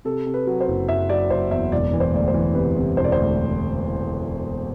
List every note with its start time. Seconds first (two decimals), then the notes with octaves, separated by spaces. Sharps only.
0.05 C3 A4
0.26 C3
0.34 B4
0.47 F#3
0.61 C5
0.68 F#1
0.89 F#1 E5
1.09 F#3 D5
1.30 F#1 C5
1.51 E2 E5
1.72 E1 D5
1.93 E3
2.00 C5
2.13 D2 D5
2.28 C5
2.34 E3
2.55 C3 B4
2.76 C3
2.97 E1 C5
3.04 D5
3.12 C5
3.18 D2